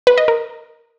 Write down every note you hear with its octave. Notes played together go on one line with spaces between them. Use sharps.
B4
D#5
A#4